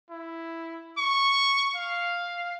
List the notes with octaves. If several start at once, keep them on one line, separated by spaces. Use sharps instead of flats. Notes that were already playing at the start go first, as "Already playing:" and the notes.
E4
C#6
F5